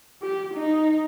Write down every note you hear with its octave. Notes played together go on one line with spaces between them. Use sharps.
G4
D#4